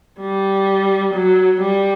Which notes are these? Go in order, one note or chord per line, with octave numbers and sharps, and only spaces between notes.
G3
F#3
G3